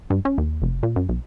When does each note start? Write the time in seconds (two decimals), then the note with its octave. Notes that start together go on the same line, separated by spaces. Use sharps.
0.10 G2
0.25 C#4
0.38 D#2
0.62 F1
0.83 A#2
0.96 F#2
1.09 B1